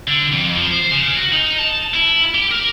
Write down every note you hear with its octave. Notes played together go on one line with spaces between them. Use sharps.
D3
F2
F3
C5
C#3
F#4
D#4
A5
E4
G4
A#4